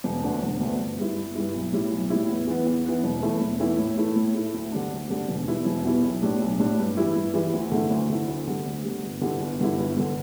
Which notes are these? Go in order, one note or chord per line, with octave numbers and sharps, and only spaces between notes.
E1
D2 D3 B3 D4
E1
D2 D3 B3 D4
G1
G2 G3 E4
G1
G2 G3 E4
B1
A2 G3 E4
B1
A2 G3 E4
E2
E3 B3
E2
E3 B3
E1
E2 E3 A3 E4
E1
E2 E3 A3 E4
A2
A3 E4
A2
A3 E4
D2
D3 G3 D4
D2
D3 G3 D4
E1
E2 B2 G3 E4
E1
E2 B2 G3 E4
B1
A2 G3 D4
B1
A2 G3 D4
G2
E3 G3 E4
G2
E3 G3 E4
D2
D3 A3 E4
D2
D3 A3 E4
D2
D3 G3
D2
D3 G3
G1
G2 D3 G3 E4
G1
G2 D3 G3 E4
G1
G2 D3